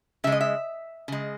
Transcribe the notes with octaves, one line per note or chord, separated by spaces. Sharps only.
C#3 G#3 E5
D#5
E5
C#3 G#3